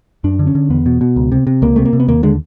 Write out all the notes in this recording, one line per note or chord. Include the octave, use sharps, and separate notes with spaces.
F#2 D4
D3
C#4
D3
E2 B3
B2
B2
C#2
C3
C3
C#2 A#3
C3 A3
A#3
C3
B3
D#2 A#3
D3 G#3